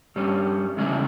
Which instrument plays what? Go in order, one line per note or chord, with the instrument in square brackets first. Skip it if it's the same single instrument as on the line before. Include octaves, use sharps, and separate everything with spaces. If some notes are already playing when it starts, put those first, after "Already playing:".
[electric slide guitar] G2 G3 C#4
E2 C#3 G#3 C#4 E4